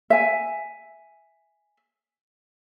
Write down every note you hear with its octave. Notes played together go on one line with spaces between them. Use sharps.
E5 G#5